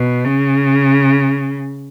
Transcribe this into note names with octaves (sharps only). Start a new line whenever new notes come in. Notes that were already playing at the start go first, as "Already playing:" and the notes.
Already playing: B2
C#3